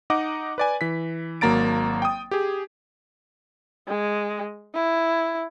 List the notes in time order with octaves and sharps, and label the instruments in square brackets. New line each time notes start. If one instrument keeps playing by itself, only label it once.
[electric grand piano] D#4 D#5 F#5 D6
B4 D5 G#5
E3 B6
G#1 F#3 A#3 A#5 A6 D7
G5 D#6
G4 G#4
[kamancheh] G#3
E4